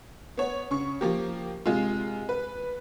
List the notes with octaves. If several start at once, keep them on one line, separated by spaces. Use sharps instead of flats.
B3 C#5
C#3 C#6
F3 A#3 G4
C3 G#3 F4
B4